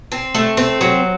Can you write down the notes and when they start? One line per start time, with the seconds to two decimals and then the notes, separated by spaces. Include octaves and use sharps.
0.12 C4
0.35 A3
0.57 C4
0.81 F#3